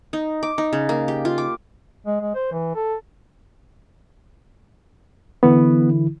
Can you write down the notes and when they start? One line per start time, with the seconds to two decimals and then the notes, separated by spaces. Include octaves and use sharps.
0.13 D#4
0.43 D6
0.58 D#4
0.73 C#3
0.89 A#3
1.08 G4
1.25 F4
1.38 D6
2.06 G#3
2.21 G#3
2.35 C5
2.52 E3
2.75 A4
5.43 D3 E3 B3 E4